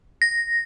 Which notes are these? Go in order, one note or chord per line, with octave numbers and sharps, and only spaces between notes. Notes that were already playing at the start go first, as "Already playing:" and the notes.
A#6